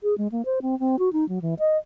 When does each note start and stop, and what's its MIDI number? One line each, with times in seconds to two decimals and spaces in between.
0.03 0.17 68
0.18 0.28 56
0.32 0.42 58
0.45 0.59 72
0.62 0.78 60
0.80 0.99 60
0.99 1.12 66
1.13 1.27 63
1.29 1.41 54
1.42 1.54 52
1.59 1.77 75